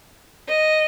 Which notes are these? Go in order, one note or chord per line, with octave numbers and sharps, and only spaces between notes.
D#5